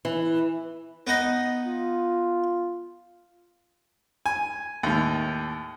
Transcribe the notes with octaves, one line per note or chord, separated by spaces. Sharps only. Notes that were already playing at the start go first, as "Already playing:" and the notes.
E3
B3 D#4 D#5
F4
G#5
D#2 A2